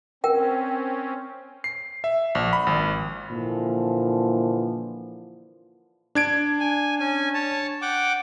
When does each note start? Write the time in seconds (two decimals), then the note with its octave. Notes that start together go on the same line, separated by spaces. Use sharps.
0.24 C4 C#4 A#4 G5
1.64 C7
2.04 E5
2.35 A#1
2.53 B5
2.67 G#1
3.28 A#2 D3 E3 F3
6.15 D4 G#6 D7
6.60 G#5
7.00 C#4 G#5
7.34 C#5 A5
7.82 F#5 G5 D6